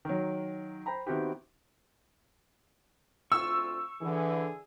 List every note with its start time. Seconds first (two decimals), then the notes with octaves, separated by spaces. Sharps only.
0.05 D#3 F#3
0.86 C5 G5 A#5 B5
1.07 D#3 B3 C4 E4 F#4 G4
3.32 D2 C4 F4 C#6 E6
4.01 D3 E3 G#4